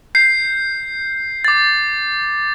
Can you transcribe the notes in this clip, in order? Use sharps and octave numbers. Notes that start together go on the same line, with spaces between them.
G6 C7
D6 A6